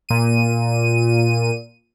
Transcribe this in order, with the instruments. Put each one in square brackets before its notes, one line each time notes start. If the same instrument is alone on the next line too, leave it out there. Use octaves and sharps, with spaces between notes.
[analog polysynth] A#2 D#7